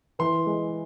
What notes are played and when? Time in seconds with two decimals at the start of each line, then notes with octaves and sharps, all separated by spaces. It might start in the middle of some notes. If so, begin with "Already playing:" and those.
0.19 E3 C6
0.46 G#3